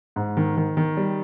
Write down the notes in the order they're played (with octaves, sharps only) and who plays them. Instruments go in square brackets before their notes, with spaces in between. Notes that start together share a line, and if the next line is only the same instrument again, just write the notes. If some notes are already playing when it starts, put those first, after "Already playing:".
[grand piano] G#2
D#3
D#3
D#3
G3